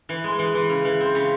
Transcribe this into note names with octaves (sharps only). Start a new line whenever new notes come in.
E3
G#3
E3
E3
C#3
E3
C4
C#3